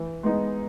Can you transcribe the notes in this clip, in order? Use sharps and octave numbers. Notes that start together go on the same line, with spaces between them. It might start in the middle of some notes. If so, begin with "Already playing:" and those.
Already playing: E3
G#3 B3 D#4